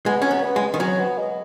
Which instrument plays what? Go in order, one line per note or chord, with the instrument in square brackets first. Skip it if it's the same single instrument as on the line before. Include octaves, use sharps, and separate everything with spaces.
[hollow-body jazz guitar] G#3 [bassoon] B3
[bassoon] F#3 [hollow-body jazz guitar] C#4
[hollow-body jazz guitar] B3
[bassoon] B3
[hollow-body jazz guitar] G#3
D#3
[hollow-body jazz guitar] F#3 [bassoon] C#4
[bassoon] B3
G#3